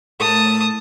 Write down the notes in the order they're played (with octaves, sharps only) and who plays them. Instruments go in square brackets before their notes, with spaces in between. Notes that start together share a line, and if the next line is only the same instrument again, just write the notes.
[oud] A2 A3 A#3 [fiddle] A5 D#6